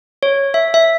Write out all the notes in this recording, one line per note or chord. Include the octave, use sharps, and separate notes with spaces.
C#5
E5
E5